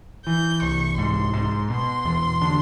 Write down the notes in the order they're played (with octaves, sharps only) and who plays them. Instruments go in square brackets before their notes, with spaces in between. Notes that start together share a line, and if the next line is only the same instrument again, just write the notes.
[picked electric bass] E3 [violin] G6
[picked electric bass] C2 [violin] C#6
[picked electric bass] G#2 [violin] C6
[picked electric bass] G#2
[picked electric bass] B2 [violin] C6
[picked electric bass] E2
D3